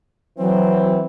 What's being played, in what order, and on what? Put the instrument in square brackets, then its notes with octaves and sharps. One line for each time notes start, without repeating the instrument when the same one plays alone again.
[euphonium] E3 [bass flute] F#3 [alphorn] C4